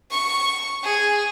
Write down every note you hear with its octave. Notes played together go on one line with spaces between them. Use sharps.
C#6
G#4